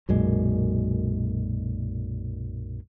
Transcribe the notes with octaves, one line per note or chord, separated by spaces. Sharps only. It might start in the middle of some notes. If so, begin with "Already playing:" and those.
B1 F#2 A#2 G#3